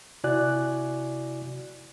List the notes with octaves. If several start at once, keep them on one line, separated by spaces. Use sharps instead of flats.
C3 E4 F#4 D5 G#5 F#6